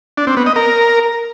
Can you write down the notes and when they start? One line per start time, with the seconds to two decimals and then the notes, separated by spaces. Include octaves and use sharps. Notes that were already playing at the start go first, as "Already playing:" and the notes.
0.18 D4
0.27 C4
0.37 B3
0.46 D#5
0.56 A#4